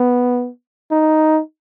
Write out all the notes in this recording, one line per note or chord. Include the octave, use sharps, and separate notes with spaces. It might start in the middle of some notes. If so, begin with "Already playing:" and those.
Already playing: B3
D#4